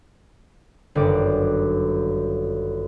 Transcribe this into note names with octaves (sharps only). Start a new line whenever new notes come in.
G1 F#2 D#3 D6